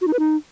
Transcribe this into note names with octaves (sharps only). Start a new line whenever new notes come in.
F#4
D#4
B4
D#4